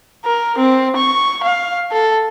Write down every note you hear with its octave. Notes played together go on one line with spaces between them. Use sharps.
A#4
C4
C#6
F5
A4